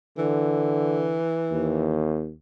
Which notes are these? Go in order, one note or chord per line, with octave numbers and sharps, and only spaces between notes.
D3 E3
D#2